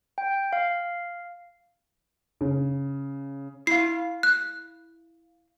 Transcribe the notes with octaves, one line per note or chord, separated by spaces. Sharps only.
G5
F5
C#3
E4 F5 C7
F#6